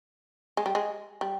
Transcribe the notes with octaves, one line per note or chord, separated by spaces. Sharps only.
G#3
G3
G#3
G3